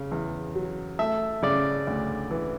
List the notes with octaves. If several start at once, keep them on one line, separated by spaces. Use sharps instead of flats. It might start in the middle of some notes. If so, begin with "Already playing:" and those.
Already playing: C#3
E2
F#3
A3 E5
C#3 D5
D2
E3